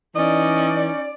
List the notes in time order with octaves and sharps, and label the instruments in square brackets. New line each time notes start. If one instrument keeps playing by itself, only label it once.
[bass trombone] E3 [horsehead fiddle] C#4 D#4 [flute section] D5 [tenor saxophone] D#5